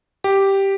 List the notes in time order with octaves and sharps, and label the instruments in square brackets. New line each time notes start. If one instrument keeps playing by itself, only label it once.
[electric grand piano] G4